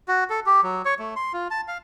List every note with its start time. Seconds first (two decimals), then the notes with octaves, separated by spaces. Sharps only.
0.08 F#4
0.30 A4
0.46 G4
0.63 F#3
0.85 C#5
0.99 A3
1.16 C6
1.33 F4
1.51 A5
1.68 F5